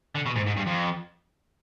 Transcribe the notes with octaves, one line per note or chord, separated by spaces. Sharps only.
D3
B2
G#2
G#2
G2
F2